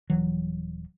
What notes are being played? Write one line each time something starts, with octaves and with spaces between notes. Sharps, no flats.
D#1 E3 F#3